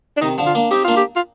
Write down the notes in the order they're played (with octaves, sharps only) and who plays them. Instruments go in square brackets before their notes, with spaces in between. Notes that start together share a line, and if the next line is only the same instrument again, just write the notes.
[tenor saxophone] D4
[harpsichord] C3 D#3 [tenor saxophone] D#4
[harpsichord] D3 F3
[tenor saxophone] F4
[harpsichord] A#3 D4
[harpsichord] C4 D#4 [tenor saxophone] G4
[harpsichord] A#3 D4 [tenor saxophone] F4
[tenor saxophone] G4
F4